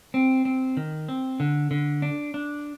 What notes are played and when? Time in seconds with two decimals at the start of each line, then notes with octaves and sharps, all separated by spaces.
0.14 C4
0.45 C4
0.77 D#3
1.09 C4
1.40 D3
1.71 D3
2.02 D4
2.34 D4